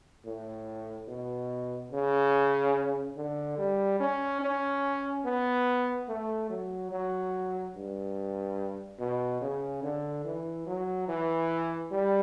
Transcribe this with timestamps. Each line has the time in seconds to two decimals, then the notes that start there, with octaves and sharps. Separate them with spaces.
0.25 A2
1.08 B2
1.91 C#3
3.16 D3
3.58 G3
4.00 C#4
4.41 C#4
5.25 B3
6.08 A3
6.49 F#3
6.91 F#3
7.75 G2
8.99 B2
9.41 C#3
9.83 D3
10.24 E3
10.66 F#3
11.08 E3
11.91 G3